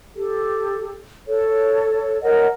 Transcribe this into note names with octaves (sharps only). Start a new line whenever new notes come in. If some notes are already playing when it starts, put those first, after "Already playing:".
G4 A4
A4 C#5
A#4 C#5 D#5 F#5